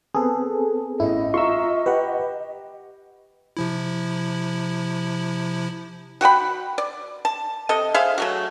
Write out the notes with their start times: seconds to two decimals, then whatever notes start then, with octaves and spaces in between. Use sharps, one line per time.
0.14 B3 C4 G#4 A4 B4
1.00 A1 E4 D#5
1.34 F4 E5 A#5 C6 C#6 E6
1.86 G4 B4 F#5
3.57 C3 F3 E4
6.21 F#4 F#5 G5 B5
6.78 D5
7.25 A5
7.69 C3 A4 D#5
7.94 G#4 C5 E5 F5
8.18 F#3 A3 F#4